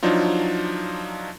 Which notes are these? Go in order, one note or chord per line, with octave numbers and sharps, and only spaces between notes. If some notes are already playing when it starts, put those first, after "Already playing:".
F3 F#3 D4 D#4 F4